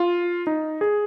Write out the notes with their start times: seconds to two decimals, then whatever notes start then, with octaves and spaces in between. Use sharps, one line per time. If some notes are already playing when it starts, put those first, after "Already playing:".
Already playing: F4
0.47 D#4
0.81 G#4